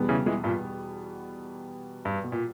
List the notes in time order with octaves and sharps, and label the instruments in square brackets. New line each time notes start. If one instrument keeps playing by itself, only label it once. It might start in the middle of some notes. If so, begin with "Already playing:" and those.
Already playing: [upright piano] E2 B2 G3 B3
[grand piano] C#3 E3
E3 G#3
G2 A#2
G2
B2
A#2